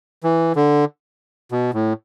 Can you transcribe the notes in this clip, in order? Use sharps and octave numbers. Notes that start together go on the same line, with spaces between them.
E3
D3
B2
A2